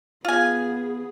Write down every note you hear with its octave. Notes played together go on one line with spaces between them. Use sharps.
B3 F4 G#4 G#5